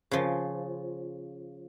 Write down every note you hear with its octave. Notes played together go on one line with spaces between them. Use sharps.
C#3 F3